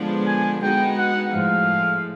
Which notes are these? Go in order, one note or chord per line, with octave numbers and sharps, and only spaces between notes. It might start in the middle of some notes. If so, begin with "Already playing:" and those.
Already playing: D3 F3 G#3 B3 D4
G#5
G#3 B3 D#4 F#4 G5
F#5
A2 F3 G#3 F5